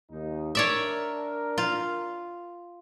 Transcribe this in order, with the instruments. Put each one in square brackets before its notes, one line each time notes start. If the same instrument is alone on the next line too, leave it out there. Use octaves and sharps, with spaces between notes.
[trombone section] D#2 D#4
[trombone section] D4 A#4 [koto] C#5 D5 E5
[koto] F4